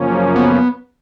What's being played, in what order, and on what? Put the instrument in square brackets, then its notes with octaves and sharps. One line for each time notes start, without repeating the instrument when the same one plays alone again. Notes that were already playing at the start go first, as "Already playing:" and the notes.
Already playing: [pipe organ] F#2 C#3 F3 A#3 C#4
[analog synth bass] B3